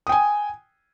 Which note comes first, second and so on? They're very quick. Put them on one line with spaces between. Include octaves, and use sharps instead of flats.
D#6 G5 G#5